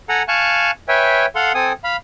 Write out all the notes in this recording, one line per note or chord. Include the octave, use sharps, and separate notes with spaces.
A4 F#5 G#5 A#5
F5 G#5 A5 C#6 F#6
B4 C#5 E5 G5 G#5
A4 F5 F#5 C6
C4 A4 G#5 D#6
F5 B5